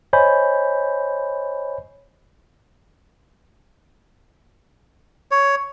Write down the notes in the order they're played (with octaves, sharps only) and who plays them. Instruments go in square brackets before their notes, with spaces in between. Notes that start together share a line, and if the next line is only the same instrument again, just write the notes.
[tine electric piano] C5 C#5 D#5 G#5 B5 G6
[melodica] C#5